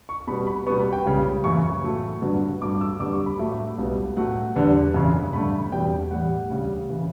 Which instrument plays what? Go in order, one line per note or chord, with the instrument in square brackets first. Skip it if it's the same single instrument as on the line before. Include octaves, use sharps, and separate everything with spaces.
[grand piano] C#6
B2 G3 B3 B5
B5
B2 G3 B3 C#6
B5
G5
C#2 C#3 G3
F#2 C#3 E3 C#6
A2 F#3 A3
G2 D3 F#3 B3
G2 F#3 A3 D6
E6
F#2 D3 G3 B3 D6
C#6
B5
A2 F#3 A3 E5
C#2 B2 G3 B3
A2 F#3 A3 F#5
E2 D3 G3 B3
F#2 C#3 E3
G2 D3 A3 B5
E2 B2 G3 G5
A2 E3 G3 F#5
D2 C#3 G3
C#3 E3